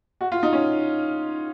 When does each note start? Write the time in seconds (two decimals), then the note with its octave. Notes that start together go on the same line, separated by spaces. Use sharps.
0.21 F#4
0.32 F4
0.43 D#4
0.53 C#4